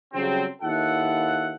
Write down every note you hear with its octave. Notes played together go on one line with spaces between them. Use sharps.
C#3 F#3 G3 C4
D#2 E4 F4 A4 F#5